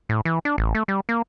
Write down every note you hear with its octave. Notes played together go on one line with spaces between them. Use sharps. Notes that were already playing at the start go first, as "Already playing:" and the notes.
A2
E3
D4
A1
A3
G3
A#3